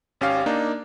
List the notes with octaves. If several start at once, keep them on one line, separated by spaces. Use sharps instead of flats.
G#1 C#4 G4 F5
A#3 D4 D#4